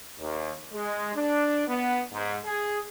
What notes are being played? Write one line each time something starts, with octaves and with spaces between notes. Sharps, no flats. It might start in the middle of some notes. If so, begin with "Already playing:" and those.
D#2
G#3
D4
B3
G#2
G#4